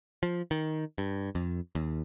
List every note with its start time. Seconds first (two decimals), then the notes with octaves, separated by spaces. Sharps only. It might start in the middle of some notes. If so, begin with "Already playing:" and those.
0.23 F3
0.51 D#3
0.98 G2
1.35 F2
1.75 D#2